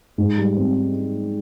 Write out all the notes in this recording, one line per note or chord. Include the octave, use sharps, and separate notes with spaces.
G#2
G3
C4